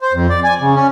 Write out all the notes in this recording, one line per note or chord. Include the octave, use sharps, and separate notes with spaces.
C5
F2
D5
G#5
C#3
C#4